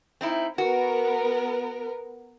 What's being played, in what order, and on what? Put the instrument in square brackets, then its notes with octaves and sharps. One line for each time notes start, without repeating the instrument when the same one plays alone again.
[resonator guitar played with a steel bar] C4 D#4 E4
[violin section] B3 A#4 [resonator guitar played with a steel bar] F#4